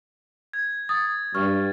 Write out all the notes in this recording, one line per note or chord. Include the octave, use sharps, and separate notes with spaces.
G#6
D#6 A6
G2 C#6 F6